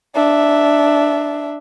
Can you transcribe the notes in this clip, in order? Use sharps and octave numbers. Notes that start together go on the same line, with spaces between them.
D4 E5